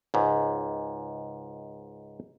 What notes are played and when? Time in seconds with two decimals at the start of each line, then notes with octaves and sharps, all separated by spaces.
0.14 C#2 G#2